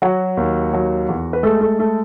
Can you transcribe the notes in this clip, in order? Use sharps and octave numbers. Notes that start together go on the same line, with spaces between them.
F#3 F#4
D#2
F#3
E2
B4
G#3 A3 A4
A3 A4
A3 A4